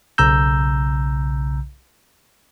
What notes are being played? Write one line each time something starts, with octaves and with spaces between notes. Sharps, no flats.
B1 C#3 A#5 E6 G6